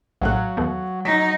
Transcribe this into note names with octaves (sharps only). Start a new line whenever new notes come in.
A#1 A2 F#3 F5 F#5 F#6
E2 A3 B3
F#3 D#4 B6